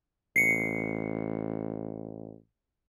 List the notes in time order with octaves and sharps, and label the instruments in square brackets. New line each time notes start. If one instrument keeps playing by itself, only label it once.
[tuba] A1 [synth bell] C7 C#7